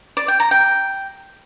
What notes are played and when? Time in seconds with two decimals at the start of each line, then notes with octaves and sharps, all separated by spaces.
0.17 D5
0.28 G5
0.40 A#5
0.51 G5